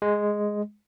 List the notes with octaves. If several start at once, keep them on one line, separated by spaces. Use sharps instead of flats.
G#3